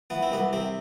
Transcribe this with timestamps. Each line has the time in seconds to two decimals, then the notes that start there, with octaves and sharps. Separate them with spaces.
0.10 E3 B3
0.23 C4
0.32 C2 B3
0.53 C3 C4